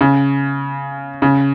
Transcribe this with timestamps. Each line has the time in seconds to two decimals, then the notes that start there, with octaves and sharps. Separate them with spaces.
0.01 C#3
1.22 C#3